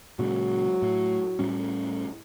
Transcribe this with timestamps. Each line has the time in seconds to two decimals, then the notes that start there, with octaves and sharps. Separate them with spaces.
0.19 A#2 C#3 F#3 G#3
0.82 A2
1.39 A2 G3 C#4